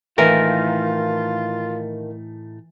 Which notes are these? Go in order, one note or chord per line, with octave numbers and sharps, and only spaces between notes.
A2 D#3 E3 A3 A#3 D#4 F4 A#4